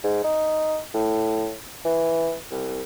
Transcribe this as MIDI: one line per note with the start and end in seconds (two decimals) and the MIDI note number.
0.04 0.21 44
0.24 0.79 63
0.94 1.54 45
1.85 2.35 52
2.51 2.82 36